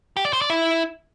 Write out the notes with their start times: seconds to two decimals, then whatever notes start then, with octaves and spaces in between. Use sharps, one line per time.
0.17 G4
0.25 D5
0.33 C5
0.42 D5
0.50 E4